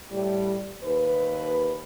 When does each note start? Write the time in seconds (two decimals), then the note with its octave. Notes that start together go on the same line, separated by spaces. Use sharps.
0.11 A2 G3
0.84 D#2 B4